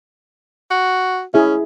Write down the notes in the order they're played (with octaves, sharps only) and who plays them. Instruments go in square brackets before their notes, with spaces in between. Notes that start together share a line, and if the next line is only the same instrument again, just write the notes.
[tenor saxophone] F#4
[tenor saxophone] C#4 [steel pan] E4 G#4 E5